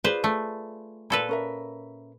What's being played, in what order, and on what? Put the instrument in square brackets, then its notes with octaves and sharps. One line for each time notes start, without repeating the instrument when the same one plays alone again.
[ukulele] F4 G#4 D5 [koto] B4 C5
[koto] A3
[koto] A#2 A4 B4 [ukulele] E4 B5
[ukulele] C#4 A#4 E5